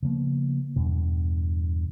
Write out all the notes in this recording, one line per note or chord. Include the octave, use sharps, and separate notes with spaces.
C#3 F3 A#3 B3
E2 G2 B2